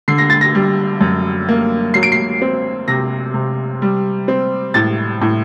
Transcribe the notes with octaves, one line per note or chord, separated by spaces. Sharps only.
D3 C7
A#6
A6
A#6
G3
F#2
A#3
F#3 C7
D7
C7
C4
C3 A#6
C3
G3
C4
A2 A6
A2